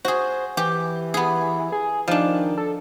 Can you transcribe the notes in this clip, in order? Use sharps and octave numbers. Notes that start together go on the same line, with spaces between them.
F#4 G#4 C5
E3 G4
B3 G#4
G#4
D#3 F3 D4
A4